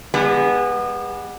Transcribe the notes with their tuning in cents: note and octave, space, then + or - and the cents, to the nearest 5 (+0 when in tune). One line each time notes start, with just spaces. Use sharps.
G#3 -30 B3 -15 G4 +10